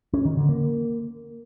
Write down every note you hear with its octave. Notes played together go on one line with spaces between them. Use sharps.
C#4
D#3
D3
A#3